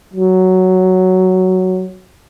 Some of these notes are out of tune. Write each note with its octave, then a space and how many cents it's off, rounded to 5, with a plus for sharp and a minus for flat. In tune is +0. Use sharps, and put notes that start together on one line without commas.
F#3 +5